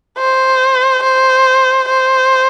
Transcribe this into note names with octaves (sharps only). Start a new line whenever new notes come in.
C5
C5
C5